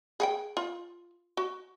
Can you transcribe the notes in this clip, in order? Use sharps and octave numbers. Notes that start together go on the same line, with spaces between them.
G#4 F#5 G5
F4
F#4